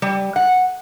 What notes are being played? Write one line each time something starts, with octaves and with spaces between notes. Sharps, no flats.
G3
F#5